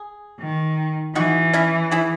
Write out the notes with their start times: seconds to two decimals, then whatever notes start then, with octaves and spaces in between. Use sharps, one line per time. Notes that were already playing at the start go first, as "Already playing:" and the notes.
Already playing: G#4
0.40 D#3
1.15 E3 D#4 F#4
1.53 C#4 E4
1.91 E4 G#4